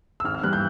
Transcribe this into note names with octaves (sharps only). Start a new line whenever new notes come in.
E6
G#1 F6
F6
G2 E3 G3 F#6
G6